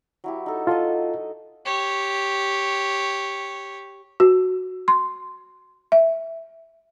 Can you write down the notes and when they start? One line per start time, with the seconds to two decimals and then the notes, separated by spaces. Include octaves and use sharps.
0.24 F#3 E4 G4
0.46 D#4 A4
0.67 F4 A4 D#5 F#5
1.66 G4 C#5
4.20 F#4
4.88 C6
5.92 E5